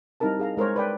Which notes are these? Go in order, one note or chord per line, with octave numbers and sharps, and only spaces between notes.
G3 C4 D#4 E4 A#4 A5
G#4 F5 A#5
G#3 A#4 C5 C#5
B4 D5 G5